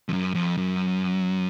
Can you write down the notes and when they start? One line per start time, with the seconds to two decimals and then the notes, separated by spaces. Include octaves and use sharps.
0.09 F2
0.13 F#2
0.35 F2
0.57 F#2